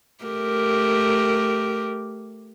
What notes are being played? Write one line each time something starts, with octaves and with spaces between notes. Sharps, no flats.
A3 G4 A#4